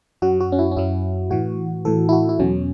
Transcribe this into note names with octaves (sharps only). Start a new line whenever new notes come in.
F#2 F#3 F#4
F#4
C#4
E4
C#4
F#2 F#3 E4
A2 E3 F#4
A2 E3 A4
E4
F#4
E4
E2 B2 F#3 C#4